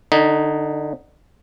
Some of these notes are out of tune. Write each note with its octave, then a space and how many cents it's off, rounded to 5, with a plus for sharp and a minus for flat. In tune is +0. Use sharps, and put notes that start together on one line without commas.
D3 +20 D#4 +0